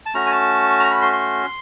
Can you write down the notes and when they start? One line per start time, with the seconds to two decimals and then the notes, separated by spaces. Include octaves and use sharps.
0.06 A5
0.14 A3 C#4 F#4 A#5
0.26 G#5
0.31 A5
0.80 A#5
0.91 B5
1.02 C6
1.13 C6